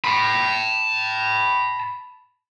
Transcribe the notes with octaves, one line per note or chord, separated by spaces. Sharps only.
A5 B5